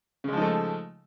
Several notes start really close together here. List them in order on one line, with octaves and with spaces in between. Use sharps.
C#3 G#3 F3 D#4 A3